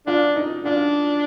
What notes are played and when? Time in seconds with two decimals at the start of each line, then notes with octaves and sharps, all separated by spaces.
0.07 D4 F4
0.36 D#4
0.65 D4 F4